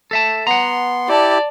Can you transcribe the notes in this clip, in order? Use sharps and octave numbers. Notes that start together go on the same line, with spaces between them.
A4 E5 A5
B3 F#5 A#5 C6
E4 G4 D5 A5